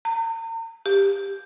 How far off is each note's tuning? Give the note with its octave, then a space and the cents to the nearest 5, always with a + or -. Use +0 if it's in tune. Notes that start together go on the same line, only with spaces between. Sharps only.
A#5 -40
G4 +15